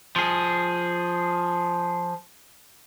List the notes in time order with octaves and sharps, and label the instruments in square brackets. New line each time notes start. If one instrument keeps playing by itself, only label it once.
[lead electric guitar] F3 G#4